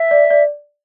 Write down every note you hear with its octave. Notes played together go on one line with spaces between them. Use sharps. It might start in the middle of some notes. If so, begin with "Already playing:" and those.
Already playing: E5
D5
D5